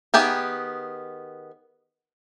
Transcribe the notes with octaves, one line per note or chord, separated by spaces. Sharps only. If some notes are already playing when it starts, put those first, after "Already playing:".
D#3 B3 G4 G#4